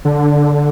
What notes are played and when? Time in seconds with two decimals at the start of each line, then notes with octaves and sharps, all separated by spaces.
0.05 D3